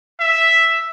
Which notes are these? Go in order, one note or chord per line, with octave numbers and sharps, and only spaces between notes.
E5